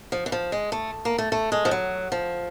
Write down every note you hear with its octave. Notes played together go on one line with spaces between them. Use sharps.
F3
E3
F3
G#3
A3
A#3
A3
A3
G#3
F3
F#3
F3